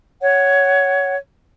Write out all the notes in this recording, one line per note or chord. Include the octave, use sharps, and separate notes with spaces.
C#5 F#5